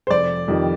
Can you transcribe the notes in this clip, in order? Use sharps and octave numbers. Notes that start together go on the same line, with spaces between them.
C5
F1 D5
F2 D#3 G3